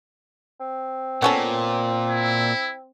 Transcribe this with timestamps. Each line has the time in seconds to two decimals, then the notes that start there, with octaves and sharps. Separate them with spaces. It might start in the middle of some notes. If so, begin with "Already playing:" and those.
0.60 C4
1.22 A#2 B3 C#4 A4
2.10 E4